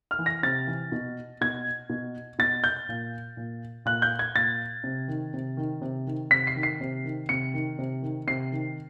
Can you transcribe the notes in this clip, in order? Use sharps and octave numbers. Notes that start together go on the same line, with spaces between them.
F6
E3
A#6
C3 A6
E3
B2
B2 G#6
B2
B2 A6
G6
A#2
A#2
A#2 F#6
G6
G#6
A#2 A6
C3
D#3
C3
D#3
C3
D#3
C3 B6
C7
D#3
C7
C3
D#3
C3 C#7
D#3
C3
D#3
C3 C7
D#3